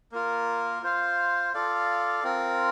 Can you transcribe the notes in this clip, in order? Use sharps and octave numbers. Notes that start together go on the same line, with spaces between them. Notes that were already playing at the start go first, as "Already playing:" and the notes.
A#3 F4 A#4
F4 C5 F5
F4 A4 D5 F5
C4 F4 A#4